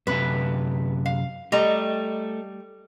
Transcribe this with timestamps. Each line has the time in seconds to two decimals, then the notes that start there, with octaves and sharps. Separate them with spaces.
0.07 F#2 C3 B4 E5
1.06 F5
1.52 G3 A3 D#5 A#5